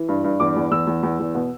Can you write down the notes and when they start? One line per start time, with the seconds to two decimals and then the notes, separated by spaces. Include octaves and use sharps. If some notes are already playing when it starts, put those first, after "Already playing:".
Already playing: E3
0.09 G2
0.24 G2
0.40 E2 D6
0.56 E2
0.71 E2 E6
0.87 E2
1.03 E2
1.19 E2
1.35 B2